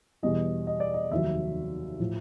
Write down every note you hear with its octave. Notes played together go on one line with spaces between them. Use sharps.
E2 B2 G3 D#5
D#5
D5
D#5
F1 D#2 D#3 F#3 E5
A2 F3